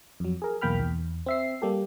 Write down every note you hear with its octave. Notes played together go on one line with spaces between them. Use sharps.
F2 F#3
G#4 A#4
B1 E2 A#3 G5 B5 F6
E2
C4 E5 C7
G3 A#3 G4 A4